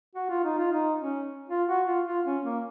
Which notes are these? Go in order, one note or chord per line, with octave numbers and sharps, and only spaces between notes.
F#4
F4
D#4
F4
D#4
C#4
F4
F#4
F4
F4
C#4
A#3